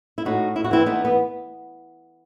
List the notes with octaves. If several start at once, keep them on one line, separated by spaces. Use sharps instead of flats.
E4
A2 D#4 F#4
E4
F#4
E3 C4 E4
B3 D#4
B3